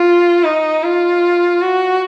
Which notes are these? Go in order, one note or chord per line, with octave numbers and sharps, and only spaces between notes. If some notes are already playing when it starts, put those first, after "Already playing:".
Already playing: F4
D#4
F4
F#4